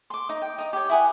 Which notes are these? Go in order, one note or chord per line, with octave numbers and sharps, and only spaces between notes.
C6 D6
D#4
G5
D#4 D#6
G4 C#5
E4 G#4 F#5